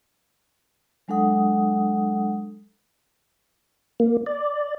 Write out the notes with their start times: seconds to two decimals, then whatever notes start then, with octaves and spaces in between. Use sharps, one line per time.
1.08 F#3 G#3 D4 A4 F#5 D#6
4.00 A#3
4.26 D5